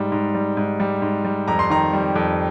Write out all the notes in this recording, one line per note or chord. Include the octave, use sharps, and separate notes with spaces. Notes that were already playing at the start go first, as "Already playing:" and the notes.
Already playing: G#2 G3
G#2
G3
G#2
G3
G#2
G3
F2 A#5
C6
D#3 A#5
G3
F2